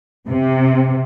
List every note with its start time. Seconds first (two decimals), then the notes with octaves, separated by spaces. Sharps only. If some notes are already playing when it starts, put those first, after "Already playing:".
0.29 C3